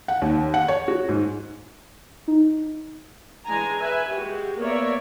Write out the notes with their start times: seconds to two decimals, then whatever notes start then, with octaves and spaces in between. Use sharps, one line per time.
0.08 F#5
0.22 D#2
0.54 F#5
0.68 C#5
0.88 F#4
1.09 G#2
2.28 D#4
3.45 E3 G#3 D4 G#5 A#5
3.79 B4 E5 G#5
4.10 G#3 F#4 G4
4.59 A#3 B3 C#5 D5 E5 A#5